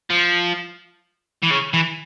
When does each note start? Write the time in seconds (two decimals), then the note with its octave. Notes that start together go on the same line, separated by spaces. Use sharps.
0.10 F3
1.43 E3
1.50 C#3
1.73 E3